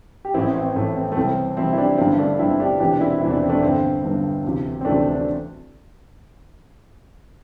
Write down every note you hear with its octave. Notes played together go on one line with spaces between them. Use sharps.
G4
A1 A2 E3 C4 E4
C4
A1 A2 E3 A3
C4
A3
C2 C3 E3 C4
C2 C3 E3 C4 E4
E4
D4 G4
G1 G2 D3 C4 E4
A3 D4
G1 G2 D3 C4 E4
D4 G4
E1 E2 C3 E3 D4 G4
D4
C4 E4
E1 E2 C3 E3 E4
D4
C4
A3 D4
G1 G2 D3 C4
G1 G2 D3
D2 C3 E3
C4
D2 C3 E3 A3 D4
D4